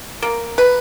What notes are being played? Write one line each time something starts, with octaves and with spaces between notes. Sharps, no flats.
A#3
B4